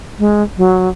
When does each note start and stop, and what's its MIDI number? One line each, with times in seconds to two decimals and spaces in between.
0.19 0.43 56
0.57 0.89 54